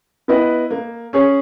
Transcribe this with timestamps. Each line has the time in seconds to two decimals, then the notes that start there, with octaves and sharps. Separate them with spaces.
0.28 B3 E4 B4 D#5
0.70 A#3
1.13 C#4 G#4 C#5